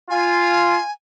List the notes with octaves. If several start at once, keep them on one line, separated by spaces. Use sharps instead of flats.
F4 G#5